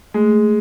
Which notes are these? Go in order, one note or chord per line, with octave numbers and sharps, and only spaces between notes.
G#3 A3